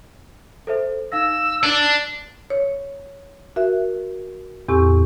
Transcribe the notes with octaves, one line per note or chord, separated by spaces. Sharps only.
A4 C5 E5
D#4 F5 E6 A#6
D4
C#5
F#4 A#4 E5
E2 A2 C4 G4 C#6 E6